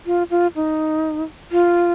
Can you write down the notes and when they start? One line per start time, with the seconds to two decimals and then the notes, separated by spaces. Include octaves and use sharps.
0.06 F4
0.30 F4
0.55 D#4
1.52 F4